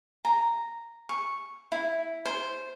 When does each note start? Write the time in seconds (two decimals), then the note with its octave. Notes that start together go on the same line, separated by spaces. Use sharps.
0.25 A#5
1.09 C#6
1.72 E4
2.25 C5